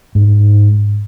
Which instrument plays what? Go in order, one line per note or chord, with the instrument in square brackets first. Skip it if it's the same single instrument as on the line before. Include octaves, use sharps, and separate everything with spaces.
[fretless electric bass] G#2